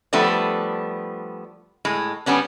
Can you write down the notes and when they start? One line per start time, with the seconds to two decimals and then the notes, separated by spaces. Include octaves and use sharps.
0.13 F3 G3 A3 B3 D4
1.85 A2 G#3
2.26 G3 B3 C#4 D4